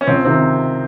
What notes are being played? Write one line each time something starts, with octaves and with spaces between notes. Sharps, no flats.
C#4
C#2 C4
C3 D#3 C4